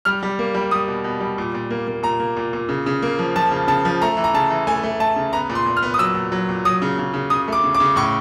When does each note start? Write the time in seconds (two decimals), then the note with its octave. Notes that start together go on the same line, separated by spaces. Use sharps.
0.05 G3 F6
0.23 G3
0.39 A#3
0.54 G3
0.71 G3 D#6
0.88 B2
1.04 B2
1.20 G3
1.38 A#2
1.54 A#2
1.70 A#3
1.87 A#3
2.03 A#2 A#5
2.20 A#3
2.37 A#2
2.53 A#2
2.69 C#3
2.86 C#3
3.02 A#3
3.19 F3
3.36 F3 A5
3.51 C#3
3.68 C#3 A5
3.85 F3
4.01 A3 A#5
4.17 E3
4.24 A#5
4.34 C#3 A5
4.50 E3
4.67 A3 G#5
4.83 A3
5.00 A3 A5
5.16 C#3
5.33 B3 A#5
5.49 A#2
5.55 C6
5.66 A#2
5.77 F6
5.82 B3
5.94 D#6
5.98 F#3 E6
6.15 A#2
6.32 F#3
6.49 A#2
6.65 F#3 D#6
6.82 C#3
6.98 C#3
7.14 C#3
7.30 C#3 D#6
7.48 A3 D6
7.64 C#3
7.75 D6
7.80 C#3
7.96 A2 C#6